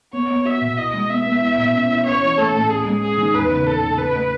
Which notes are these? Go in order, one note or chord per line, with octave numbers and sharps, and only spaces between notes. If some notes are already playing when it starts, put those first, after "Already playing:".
B3 C#5
B3
F#4 E5
B2
E4 D#5
G#3
B3 E5
B3
E4
B2
C#4
E4
C#4 C#5
E3
A3 A4
A2
C#4 G#4
G#3
C#4 G#4
D#3
E2 B4
C#3
C#3 A4
C#3
C#4 B4
A3